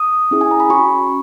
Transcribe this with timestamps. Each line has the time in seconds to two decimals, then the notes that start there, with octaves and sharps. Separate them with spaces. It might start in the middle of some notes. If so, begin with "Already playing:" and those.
Already playing: D#6
0.31 C#4 E4 G#4
0.41 G#5
0.51 A#5
0.60 B5
0.69 C#4 F#4 C#6